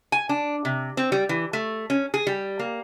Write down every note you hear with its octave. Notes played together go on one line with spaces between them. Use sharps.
G#5
D4
C3
C4
G3
E3
A3
C#4
G#4
G3
A#3